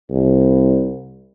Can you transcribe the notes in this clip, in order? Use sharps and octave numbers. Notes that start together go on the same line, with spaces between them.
C2